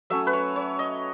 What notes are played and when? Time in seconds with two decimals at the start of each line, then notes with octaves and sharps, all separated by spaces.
0.10 F#3 A3 C#4 E5
0.27 B4
0.33 C#5
0.56 C#5
0.79 D#5